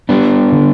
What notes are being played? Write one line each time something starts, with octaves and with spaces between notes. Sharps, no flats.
G3 B3 D4
D3